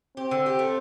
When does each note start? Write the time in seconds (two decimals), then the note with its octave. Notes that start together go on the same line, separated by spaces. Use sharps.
0.17 C4 G4
0.31 D3
0.46 G4
0.59 A3